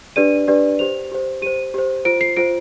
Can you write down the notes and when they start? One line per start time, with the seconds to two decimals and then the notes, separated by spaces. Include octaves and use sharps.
0.16 D4 G4 B4 D5 D#7
0.48 D4 G4 B4 D5
0.79 G4 C5 F7
1.12 G4 C5
1.42 G4 C5 D#7
1.74 G4 C5
2.05 F4 C5 D7
2.21 C7
2.37 F4 C5 D7